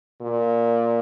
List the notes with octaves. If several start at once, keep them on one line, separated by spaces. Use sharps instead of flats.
A#2